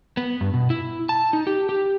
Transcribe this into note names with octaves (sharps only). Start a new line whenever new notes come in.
B3
G2
B2
E4
A5
D#4
G4
G4